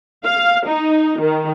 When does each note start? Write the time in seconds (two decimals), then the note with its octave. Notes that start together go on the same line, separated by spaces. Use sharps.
0.25 F5
0.68 D#4
1.21 D#3